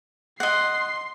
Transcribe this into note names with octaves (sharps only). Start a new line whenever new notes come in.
D#5 F#5 C6 C7